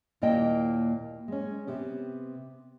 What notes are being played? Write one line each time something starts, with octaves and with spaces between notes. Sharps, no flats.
D#2 A#2 A#3 E4 D#5 G5
G#3 C#4
C3 B3 G4